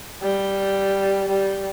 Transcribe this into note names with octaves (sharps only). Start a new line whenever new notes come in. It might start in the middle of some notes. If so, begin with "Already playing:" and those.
G3
G3